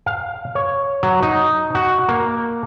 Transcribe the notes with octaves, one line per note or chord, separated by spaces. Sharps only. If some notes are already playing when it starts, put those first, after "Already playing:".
F5
C#5
F#3
D#4
F#4
A#3